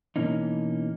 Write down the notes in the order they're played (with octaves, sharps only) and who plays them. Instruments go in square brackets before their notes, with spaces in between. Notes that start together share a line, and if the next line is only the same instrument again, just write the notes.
[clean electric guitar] B2 E3 A#3 C#4 D#4